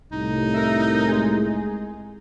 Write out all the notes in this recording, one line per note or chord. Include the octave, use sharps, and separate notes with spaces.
C2 A2 D#4
A#4 E5
G#3 G#4